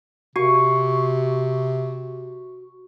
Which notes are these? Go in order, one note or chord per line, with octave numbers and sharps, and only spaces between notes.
C3 F#4 C#6